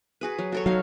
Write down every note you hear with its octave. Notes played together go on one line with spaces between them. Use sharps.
F#4 G#4 B4
F#3
F#4 A4 C#5
F#3 D#4 F5